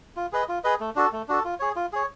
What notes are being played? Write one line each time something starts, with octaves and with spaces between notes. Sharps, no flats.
F4
G#4 B4 D#5
F4
G#4 B4 D#5
A3
D4 F#4 A4
A3
D4 F#4 A4
F4
G#4 C#5
F4
G#4 C#5